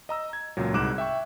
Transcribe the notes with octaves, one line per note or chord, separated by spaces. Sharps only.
D#5 A#5 E6
G#6
C#2 A#2 F#3
C2 G#2 D6 F#6 E7
E5 G5 C#6